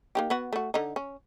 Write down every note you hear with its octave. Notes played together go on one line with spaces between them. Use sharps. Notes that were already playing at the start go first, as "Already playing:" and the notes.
A#3 D#4 G4
B3 F#4
A3 F#4
D3 D#4
C#4